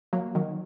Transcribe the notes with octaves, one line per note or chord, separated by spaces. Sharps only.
F#3 A#3
D#3 F#3